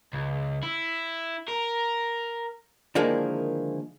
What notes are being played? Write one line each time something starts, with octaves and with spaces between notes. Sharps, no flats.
C#2
E4
A#4
D3 D#3 F3 G#3 A#3 E4